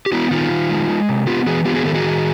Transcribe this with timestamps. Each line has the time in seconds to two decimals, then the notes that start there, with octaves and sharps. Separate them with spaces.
0.06 G4
0.12 B3 E4 F#4
0.31 D#3 D#4 F4
0.51 D#3
0.70 G#3
0.89 G#3
1.09 C3
1.27 B3 F4 G4
1.46 E3 F#4 G#4
1.65 B3 F4 G4
1.75 F#4 G#4
1.85 D#3 G4 A4
1.94 F#4 G#4
2.04 D#3